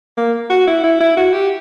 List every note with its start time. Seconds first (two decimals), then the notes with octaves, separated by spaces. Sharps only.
0.17 A#3
0.50 F#4
0.67 E4
0.83 E4
1.00 E4
1.17 F#4
1.33 G4